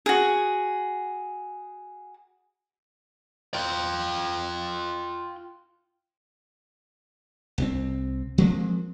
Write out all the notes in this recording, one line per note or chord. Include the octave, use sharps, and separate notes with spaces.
F#4 G#4
F4 G5
C2 G#3 C4
F3 G#3 A#3 C4